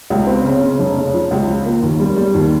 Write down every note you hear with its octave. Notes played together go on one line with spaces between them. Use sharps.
C#2
C4
C#3
C#3
F1
C#3
F3
C#2
F3
A#3
D#2
G3
G3
D#2